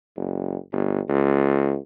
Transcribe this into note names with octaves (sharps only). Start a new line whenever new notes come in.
F#1
G1
C#2